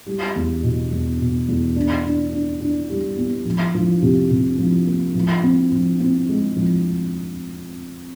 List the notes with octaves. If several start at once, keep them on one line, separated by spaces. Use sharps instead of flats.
G3
E2
B2
E2
B2
E2
D4
D4
D4
D4
G3
B3
F3
F3
C3
C3
F3
A#3
F3
C4
F3
C4
G#3
F3